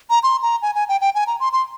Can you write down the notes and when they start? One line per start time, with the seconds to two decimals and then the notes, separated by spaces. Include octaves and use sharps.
0.10 A#5
0.23 C6
0.42 A#5
0.62 G#5
0.75 G#5
0.89 G5
1.01 G5
1.15 G#5
1.27 A#5
1.40 C6
1.53 C6